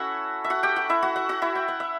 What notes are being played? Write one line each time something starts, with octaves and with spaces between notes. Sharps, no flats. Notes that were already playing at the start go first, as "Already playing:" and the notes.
Already playing: C#4 E4 F#4 A4 E5 F#5
E5
F#4 F#5
G4 G5
F#4 F#5
E4 E5
F#4 F#5
F#4 F#5
F#4 F#5
E4 E5
G5
F#5
E5